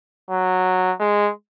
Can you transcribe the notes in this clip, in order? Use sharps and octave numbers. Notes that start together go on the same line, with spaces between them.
F#3
G#3